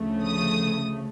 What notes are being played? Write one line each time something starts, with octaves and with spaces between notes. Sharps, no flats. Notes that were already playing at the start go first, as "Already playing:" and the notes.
Already playing: D2 C#3 F3 A3
D#6